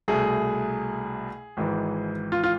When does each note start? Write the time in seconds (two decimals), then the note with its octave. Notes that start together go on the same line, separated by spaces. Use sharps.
0.08 C2 B2 A3 G#4
1.57 G#1 G#2 E3
2.32 F4
2.44 F4